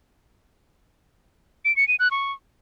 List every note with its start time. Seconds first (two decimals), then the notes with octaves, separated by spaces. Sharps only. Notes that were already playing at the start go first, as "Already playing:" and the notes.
1.65 D7
1.76 C#7
1.88 D#7
1.99 F#6
2.11 C#6